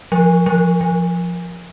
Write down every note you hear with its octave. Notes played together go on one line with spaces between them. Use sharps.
F3
F3
F3